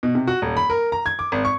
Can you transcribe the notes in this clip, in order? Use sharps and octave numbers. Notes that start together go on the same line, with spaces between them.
B2
C3
F#4
D#1
B5
A#4
A#5
G#6
D6
G#1
C#6